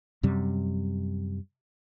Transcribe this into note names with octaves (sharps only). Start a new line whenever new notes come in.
F#2 C3 G3